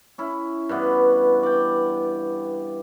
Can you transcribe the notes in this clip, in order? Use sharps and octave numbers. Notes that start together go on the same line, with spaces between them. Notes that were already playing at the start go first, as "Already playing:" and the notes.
C#4 E4
G2 E3 B3 F#4
D5 G5